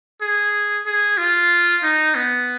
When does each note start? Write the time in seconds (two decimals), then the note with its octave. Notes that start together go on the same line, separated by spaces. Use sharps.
0.21 G#4
0.86 G#4
1.18 F4
1.83 D#4
2.15 B3